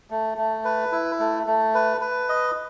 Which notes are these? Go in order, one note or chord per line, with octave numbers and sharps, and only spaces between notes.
A3
A3
B4
E4
A3
A3
B4
B4
D#5